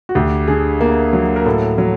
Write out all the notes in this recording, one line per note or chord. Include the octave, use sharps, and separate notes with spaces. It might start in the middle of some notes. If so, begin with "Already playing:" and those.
F#4
D2 G4
D3 G#4
A#3
F#3
A#4
A2 A4
F#3